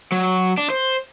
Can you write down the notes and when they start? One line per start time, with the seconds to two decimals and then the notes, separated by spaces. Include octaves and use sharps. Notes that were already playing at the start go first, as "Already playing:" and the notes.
0.12 F#3
0.58 D4
0.70 C5